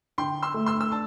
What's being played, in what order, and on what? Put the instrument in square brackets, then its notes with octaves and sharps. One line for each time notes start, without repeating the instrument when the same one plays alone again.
[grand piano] D3 [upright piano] G5 C6
[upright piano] C6 E6
[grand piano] A3
[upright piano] C6 E6
E6
[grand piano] D4 [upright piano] A5